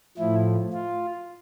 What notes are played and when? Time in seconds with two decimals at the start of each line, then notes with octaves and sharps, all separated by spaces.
0.18 A2 F3 E4
0.73 F4